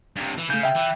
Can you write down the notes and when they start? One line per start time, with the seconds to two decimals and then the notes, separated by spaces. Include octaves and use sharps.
0.16 G2 C3
0.38 E3
0.50 C#3 A3 G6
0.63 E5 G5
0.76 E3